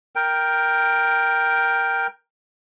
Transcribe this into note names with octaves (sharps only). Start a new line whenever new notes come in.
A#4 G5